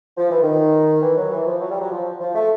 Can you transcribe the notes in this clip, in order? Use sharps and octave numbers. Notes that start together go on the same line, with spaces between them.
F3
E3
D#3
E3
F#3
E3
F3
F#3
G3
F#3
F3
F3
A3